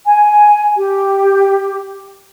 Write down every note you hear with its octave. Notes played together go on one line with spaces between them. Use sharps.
G#5
G4